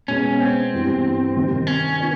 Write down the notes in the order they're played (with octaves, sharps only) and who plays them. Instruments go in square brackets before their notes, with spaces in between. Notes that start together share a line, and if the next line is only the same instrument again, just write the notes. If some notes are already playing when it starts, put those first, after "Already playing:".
[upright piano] B2 G#3 B3 [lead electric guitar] C#4
[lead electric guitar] C4
[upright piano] G2 E3 G3 B3 E4
C3 D#3 G3
[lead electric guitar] C#4
[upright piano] B3 D4 F4 A#4